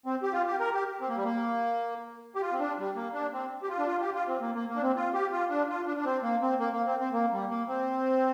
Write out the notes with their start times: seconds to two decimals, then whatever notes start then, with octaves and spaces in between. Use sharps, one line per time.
0.06 C4
0.23 G4
0.33 F4
0.47 G4
0.60 A#4
0.74 G4
1.01 C4
1.09 A#3
1.17 G3
1.24 A#3
2.35 G4
2.41 F4
2.52 C4
2.60 D4
2.78 G3
2.96 A#3
3.14 D4
3.33 C4
3.63 G4
3.69 F4
3.79 D4
3.87 F4
4.01 G4
4.15 F4
4.28 C4
4.41 A#3
4.55 A#3
4.69 A#3
4.76 D4
4.82 C4
4.96 F4
5.14 G4
5.32 F4
5.50 D4
5.69 F4
5.87 D4
5.97 D4
6.05 C4
6.23 A#3
6.42 C4
6.60 A#3
6.73 A#3
6.87 C4
7.00 C4
7.13 A#3
7.32 G3
7.50 A#3
7.68 C4